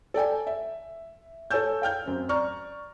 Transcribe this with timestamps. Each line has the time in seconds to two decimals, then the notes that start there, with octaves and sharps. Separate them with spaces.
0.14 A4 D5 G5 G#5
0.47 E5
1.51 A4 C#5 G#5 E6 G6
1.82 F5 G5 F6 G6
2.06 F#2 C4
2.29 D5 A#5 C#6 F6